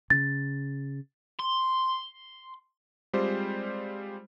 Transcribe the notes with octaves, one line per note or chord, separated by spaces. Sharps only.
C#3 A6
C6
G3 G#3 C4 F4 G4 C5